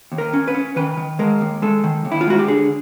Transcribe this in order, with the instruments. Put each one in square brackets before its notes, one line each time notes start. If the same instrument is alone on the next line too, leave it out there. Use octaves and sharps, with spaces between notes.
[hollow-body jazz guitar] D#2
A#4
C#4
B4
C#4
D#3 B4
D#3
G#3 A#4
D#2
G#3 A4
D#3
D#2
E4
F4
G#3 F#4
G4
D3 G#4